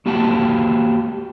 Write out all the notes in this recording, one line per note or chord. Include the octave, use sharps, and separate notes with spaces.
A#3 F#4 G4 F5 A5